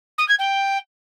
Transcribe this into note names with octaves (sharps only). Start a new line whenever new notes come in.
D#6
G#6
G5